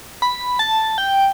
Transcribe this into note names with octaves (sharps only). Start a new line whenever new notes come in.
B5
A5
G5